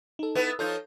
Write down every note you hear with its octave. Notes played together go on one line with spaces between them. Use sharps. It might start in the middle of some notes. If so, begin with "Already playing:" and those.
D#4 A4
B3 E4 B4
F3 D#4 F4 A4 C#5 G6